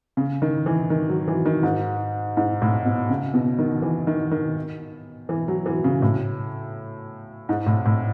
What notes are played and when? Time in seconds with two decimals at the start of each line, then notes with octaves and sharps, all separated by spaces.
0.17 C#3
0.42 D#3
0.66 E3
0.90 D#3
1.09 F#3
1.28 E3
1.46 D#3
1.63 G#2
2.37 G#2
2.62 A2
2.85 B2
3.10 C#3
3.34 B2
3.59 D#3
3.82 E3
4.07 D#3
4.31 D#3
5.29 E3
5.48 F#3
5.66 E3
5.84 C#3
6.02 A2
7.49 G#2
7.66 A2
7.86 A2